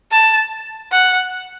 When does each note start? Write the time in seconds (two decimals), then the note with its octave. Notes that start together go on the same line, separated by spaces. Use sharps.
0.11 A5
0.91 F#5